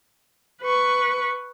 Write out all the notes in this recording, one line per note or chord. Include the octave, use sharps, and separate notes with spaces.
B4 C#6